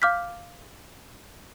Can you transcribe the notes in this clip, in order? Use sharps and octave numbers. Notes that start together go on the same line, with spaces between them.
F5 D6 F6 G6 B6